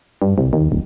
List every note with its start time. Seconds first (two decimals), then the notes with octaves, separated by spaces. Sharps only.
0.22 G2
0.38 C2
0.53 D#2
0.72 D1